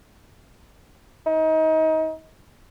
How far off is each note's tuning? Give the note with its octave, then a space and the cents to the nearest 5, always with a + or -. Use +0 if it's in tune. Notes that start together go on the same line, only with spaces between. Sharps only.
D#4 +30